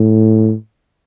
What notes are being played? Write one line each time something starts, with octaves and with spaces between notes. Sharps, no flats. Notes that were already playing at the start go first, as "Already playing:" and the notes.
Already playing: A2